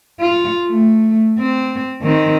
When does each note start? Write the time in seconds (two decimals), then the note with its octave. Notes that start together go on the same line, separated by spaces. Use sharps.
0.20 F4
0.67 A3
1.39 C4
2.02 D#3 C4